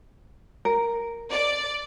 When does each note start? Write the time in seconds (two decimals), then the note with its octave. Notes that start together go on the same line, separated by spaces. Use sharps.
0.65 A#4
1.31 D5